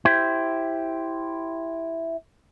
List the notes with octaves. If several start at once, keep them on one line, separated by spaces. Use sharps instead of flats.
E4 G4 C5